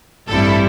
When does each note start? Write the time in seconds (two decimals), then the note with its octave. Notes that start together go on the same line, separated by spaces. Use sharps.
0.27 A1 G2 G3 C4 E4 A4